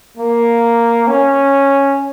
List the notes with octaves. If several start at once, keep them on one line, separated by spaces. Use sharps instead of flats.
A#3
C#4